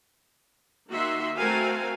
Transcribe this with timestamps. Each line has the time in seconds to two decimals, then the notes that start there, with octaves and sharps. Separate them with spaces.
0.89 D#3 A#3 D#4 F#4 E5 C6
1.36 A3 C4 F#4 A#4 F5 G#5